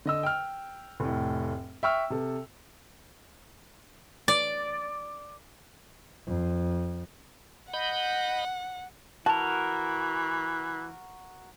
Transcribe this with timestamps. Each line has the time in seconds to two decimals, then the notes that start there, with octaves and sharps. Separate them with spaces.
0.05 D3 D#5 E6
0.23 G5 F6
1.00 F1 A2
1.83 E5 G5 C#6 E6 F6
2.10 C3 A4
4.28 D5
6.26 F2
7.74 D#5 F#5 B5 G6
9.26 E3 F#4 A#4 A5